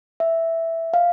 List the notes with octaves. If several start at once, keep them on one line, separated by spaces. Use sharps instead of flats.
E5
F5